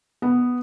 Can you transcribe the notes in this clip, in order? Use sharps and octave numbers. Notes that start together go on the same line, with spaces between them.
B3